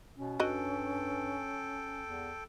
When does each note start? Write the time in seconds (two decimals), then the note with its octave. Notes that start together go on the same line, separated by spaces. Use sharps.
0.16 B2 C#4
0.40 G2 F#4 A4 D#5 G5
2.05 E2